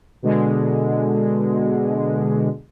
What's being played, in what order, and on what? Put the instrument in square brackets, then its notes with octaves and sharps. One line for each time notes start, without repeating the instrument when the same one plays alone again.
[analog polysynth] B2 D3 G#3